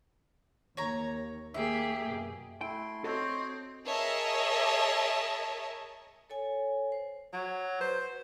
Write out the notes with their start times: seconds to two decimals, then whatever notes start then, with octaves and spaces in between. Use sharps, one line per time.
0.77 D#2 C#5 A#5
1.54 D#2 A#3 G4 G#4 E5
2.05 F#2 B2
2.61 A3 E4 G5 C6
3.04 C4 F#4 A4 C#5 D#5
3.87 G#4 A#4 C#5 D#5 E5 A5
6.30 A4 C#5 G#5
6.92 C5
7.33 F#3 C#6
7.81 B4 C5